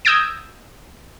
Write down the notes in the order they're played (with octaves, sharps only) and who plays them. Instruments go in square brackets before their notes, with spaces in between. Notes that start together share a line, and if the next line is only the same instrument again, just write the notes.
[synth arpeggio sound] D#6 E6 G6 G#6 A#6 D7